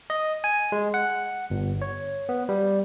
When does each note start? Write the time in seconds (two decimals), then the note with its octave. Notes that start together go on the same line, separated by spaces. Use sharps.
0.10 D#5
0.44 G#5
0.72 G#3
0.94 F#5
1.50 G1
1.82 C#5
2.29 B3
2.49 G3